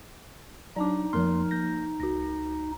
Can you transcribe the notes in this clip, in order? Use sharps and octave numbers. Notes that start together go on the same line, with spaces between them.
F#3 D4 D#4 D5 A5 D6
F2 F3 A#3 A#4 C6 F6
A#3 G6 A#6
C#2 F#4 A#6